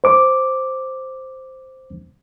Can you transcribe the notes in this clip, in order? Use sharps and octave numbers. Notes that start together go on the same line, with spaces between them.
C5 D6